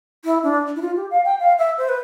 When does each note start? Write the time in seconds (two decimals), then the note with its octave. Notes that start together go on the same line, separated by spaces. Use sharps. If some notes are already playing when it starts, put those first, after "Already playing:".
0.25 E4
0.43 D4
0.76 E4
0.81 F4
0.96 G4
1.11 F5
1.25 G5
1.39 F5
1.58 E5
1.78 C5
1.89 B4